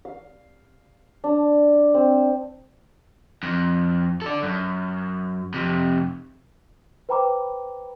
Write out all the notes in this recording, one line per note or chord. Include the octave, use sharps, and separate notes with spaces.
F5
D4
C4
F2
A4 D5
F#2
F2 C3
B4 C5 G5 A#5 B5 D6